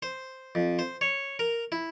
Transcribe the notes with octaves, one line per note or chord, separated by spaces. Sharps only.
C5
F2
C5
C#5
A#4
E4